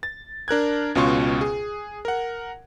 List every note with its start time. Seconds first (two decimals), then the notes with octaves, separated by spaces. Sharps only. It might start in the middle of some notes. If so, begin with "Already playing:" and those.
0.03 A6
0.48 D4 A#4 F#6 G#6
0.95 C#2 B2 C#4 F4 C6 C#6
1.41 G#4
2.05 A#4 F#5